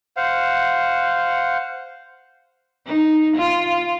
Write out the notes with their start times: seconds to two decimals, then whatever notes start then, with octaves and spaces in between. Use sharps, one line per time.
0.17 C5 F5 F#5
2.86 D#4
3.37 F4